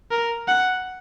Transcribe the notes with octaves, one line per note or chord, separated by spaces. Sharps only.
A#4
F#5